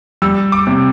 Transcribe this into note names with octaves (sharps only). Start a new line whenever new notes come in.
G3 E6
D6
C3